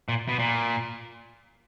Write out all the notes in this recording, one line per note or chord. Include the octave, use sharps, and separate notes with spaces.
A#2
B2
A#2